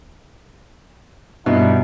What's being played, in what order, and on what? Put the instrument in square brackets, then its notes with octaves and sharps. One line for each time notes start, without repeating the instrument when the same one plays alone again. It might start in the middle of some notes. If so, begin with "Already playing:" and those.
[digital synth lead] G2 [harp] B2 [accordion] D#4 E4 F#5